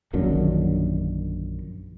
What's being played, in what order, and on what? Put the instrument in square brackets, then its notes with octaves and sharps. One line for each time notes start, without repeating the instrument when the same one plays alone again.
[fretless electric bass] A#1 F#2 D3 D#3